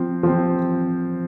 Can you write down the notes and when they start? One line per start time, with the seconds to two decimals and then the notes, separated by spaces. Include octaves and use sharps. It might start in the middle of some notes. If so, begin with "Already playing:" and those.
Already playing: F3 C4
0.23 F3 C4